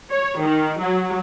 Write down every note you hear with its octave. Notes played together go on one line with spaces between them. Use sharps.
C#5
D#3
F#3